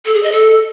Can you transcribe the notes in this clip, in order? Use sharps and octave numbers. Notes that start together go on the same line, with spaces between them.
A4
G#4
D#5
A4